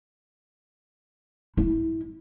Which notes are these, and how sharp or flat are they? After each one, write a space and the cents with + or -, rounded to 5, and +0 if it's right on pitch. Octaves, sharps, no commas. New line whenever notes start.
E4 -20